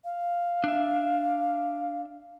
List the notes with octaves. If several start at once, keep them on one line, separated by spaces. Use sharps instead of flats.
F5
D4 E5